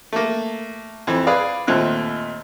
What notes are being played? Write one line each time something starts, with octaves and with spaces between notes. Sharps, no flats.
A3 A#3
F2 E3 C4
G#4 B4 D5 F5
D#2 A#2 A3 C4 F#6